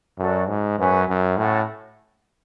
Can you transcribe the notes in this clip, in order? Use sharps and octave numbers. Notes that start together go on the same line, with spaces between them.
F#2 F#4 A4 D5
G#2
F#2 C#4 G#4 B4
F#2
A2 C#4 F#4 A4